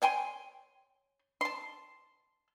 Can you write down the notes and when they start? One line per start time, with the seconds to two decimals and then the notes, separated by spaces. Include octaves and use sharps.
0.02 C#5 G5 G#5 C6
1.41 A5 C6